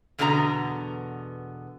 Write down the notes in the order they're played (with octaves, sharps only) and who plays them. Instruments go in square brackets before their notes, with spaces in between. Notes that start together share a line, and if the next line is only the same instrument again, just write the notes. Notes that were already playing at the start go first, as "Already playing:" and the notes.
[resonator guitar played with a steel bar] E2 B2 D3 B3 F4 A#5